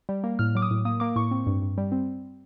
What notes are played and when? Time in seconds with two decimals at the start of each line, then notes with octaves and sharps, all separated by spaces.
0.09 G3
0.24 A#3
0.39 A2 F6
0.55 F#3 D6
0.62 D#6
0.71 A2
0.85 A#3 D#6
1.00 A#3 D6
1.16 A2 C#6
1.31 C4
1.47 G2
1.62 G2
1.78 G3
1.92 C4